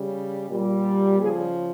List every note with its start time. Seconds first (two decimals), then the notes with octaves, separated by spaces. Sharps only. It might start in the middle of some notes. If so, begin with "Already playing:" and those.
Already playing: C#3 G3
0.49 A#2 G3
1.19 C#3 F3 G#4